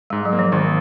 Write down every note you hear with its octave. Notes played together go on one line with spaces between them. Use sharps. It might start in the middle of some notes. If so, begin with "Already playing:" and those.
G#2 G#3
F#3
A#3
F3
G#1 D#3